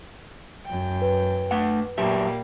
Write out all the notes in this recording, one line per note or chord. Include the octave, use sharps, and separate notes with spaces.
F#2 G5
B4
A3 F#5
A#2 F#3 G3 A#3 G4 E5